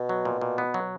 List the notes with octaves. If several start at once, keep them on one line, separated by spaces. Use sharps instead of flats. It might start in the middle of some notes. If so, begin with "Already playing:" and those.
Already playing: B2
F#3
A#2
A#2
B3
F#3